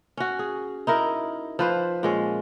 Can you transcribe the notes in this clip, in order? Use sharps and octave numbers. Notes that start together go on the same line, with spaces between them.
C#4 F#4
G#4
D#4 E4 A#4
F3 B4 C5
A#2 G#3 C#4